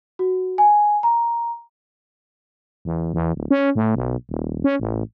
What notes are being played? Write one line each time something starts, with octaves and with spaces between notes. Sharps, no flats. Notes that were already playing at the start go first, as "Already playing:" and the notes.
F#4
G#5
A#5
E2
E2
D1
C#4
A2
B1
D#1
C#4
A1